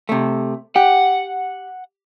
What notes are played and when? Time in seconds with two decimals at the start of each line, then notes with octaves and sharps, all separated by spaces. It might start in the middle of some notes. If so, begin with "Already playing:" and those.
0.09 C3 A3
0.76 G4 F#5